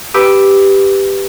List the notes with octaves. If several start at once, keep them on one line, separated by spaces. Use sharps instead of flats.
G4 B4 D6 E6